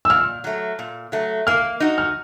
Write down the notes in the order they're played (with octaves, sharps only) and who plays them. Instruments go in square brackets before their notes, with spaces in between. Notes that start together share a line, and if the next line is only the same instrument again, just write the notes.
[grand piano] E6
[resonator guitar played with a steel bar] A#2 [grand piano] F6
[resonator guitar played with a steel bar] F#3 A3
A#2
F#3 A3
[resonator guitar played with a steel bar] A#3 [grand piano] F6
[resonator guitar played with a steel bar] D#4 F#4
[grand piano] F6